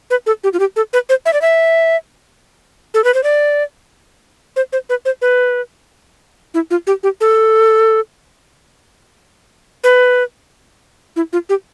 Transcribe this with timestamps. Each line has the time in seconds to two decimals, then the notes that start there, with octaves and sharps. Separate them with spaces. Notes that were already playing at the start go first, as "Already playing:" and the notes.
0.10 B4
0.26 A4
0.44 G4
0.53 F4
0.59 G4
0.76 A4
0.93 B4
1.09 C5
1.26 E5
1.33 D5
1.42 E5
2.94 A4
3.04 B4
3.14 C5
3.24 D5
4.56 C5
4.73 C5
4.89 B4
5.05 C5
5.22 B4
6.54 E4
6.71 F4
6.87 G4
7.03 G4
7.21 A4
9.84 B4
11.16 E4
11.33 F4
11.49 G4